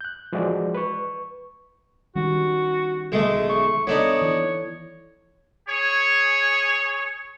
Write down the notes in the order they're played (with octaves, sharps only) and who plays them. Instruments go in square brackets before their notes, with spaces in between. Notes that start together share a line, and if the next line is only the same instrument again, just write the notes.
[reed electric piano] F#6 G6
E3 F3 G#3 F#4 G#4 D5
B4 C#6
[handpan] D#3 G3 C#4 [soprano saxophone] F#4
[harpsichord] B1 G#3 A3
[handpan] E5 [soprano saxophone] C#6
[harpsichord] B3 D4 D#4 [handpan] A4 [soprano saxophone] C#5
[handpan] E3
[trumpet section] G#4 C#5